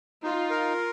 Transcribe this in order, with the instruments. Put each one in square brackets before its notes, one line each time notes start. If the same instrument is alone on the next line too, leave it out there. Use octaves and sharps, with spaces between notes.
[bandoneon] D#4 [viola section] F4
[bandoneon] A#4